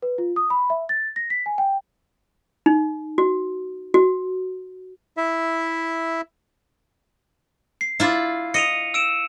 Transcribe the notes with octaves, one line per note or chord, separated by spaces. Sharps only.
B4
F4
D#6
B5
E5
A6
A#6
B6
G#5
G5
D#4
F#4
F#4
E4 E5
C7
E4 F4 D5
D#5 C#7 D#7 F7
E6 D7 E7